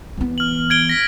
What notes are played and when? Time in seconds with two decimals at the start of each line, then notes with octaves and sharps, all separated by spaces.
0.18 E3 B3
0.38 F6 F#7
0.70 G#6 D7 G7
0.89 A#6 B6